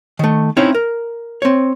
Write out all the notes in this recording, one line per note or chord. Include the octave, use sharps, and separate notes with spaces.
D#3 A3
C4 C#4 D#4 E4 C#5 F5
A#4
C4 C#5